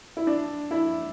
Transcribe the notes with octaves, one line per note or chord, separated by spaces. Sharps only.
E4
D4
E4